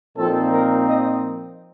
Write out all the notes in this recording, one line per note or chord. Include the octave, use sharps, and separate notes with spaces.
A#2 F3 C4 D#4 A4
A#4
D#5